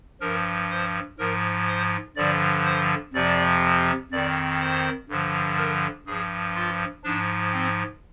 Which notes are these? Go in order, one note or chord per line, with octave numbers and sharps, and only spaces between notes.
G2 F3 A#4
C5
G#2 F3 A#4
C5
G2 D3 F3 D5
C5
F2 C3 F3 D5
F2 D#3 D5
C5
G2 D3 F3
A#4
G2 F3 G#4
F4
G#2 F3 D4
C4